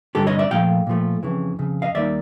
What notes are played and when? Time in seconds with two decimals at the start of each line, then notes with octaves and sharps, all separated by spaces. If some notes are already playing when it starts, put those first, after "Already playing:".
0.15 G2 D3 G3 G4 A4
0.27 C#5 D#5
0.39 D5 E5
0.51 A#2 F3 A3 F5 G5
0.87 A#2 F3 A3
1.23 F2 C#3 E3
1.59 F2 C#3
1.82 D#5 F5
1.94 D#2 D#3 G3 A#3 D#4 D5 E5